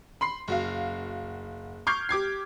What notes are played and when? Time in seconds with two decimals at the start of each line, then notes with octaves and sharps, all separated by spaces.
0.21 B5 C6 C7
0.48 F#1 F#4 F5
1.87 C#6 D6 F6 G6 G#6 C7
2.09 G4 D6 G#6 C7